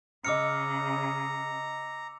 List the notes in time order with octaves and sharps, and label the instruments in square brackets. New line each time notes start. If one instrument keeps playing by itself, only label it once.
[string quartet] C#3 [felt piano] D#5 F6 [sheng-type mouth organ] A#5 [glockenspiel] D6 E6 C#7